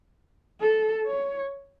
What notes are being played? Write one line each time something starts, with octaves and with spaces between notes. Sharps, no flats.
A4
C#5